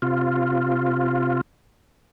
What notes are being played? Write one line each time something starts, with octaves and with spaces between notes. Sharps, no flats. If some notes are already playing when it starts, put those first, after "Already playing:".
C3 F4